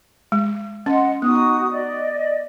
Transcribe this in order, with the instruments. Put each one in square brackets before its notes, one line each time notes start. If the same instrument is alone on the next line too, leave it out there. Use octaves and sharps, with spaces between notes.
[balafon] G#3
[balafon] C#4 [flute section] D#5 F#5 C6
[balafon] B3 [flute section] D#4 F#4 D#6
[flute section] D5 D#5